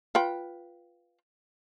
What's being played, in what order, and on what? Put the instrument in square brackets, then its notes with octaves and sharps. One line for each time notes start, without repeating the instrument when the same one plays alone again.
[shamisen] F4 B4 G5